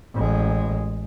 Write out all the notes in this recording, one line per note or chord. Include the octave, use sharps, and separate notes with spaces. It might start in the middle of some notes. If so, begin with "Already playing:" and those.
A1 G#3